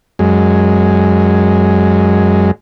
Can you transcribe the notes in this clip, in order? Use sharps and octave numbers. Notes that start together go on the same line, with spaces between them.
F#2 G#3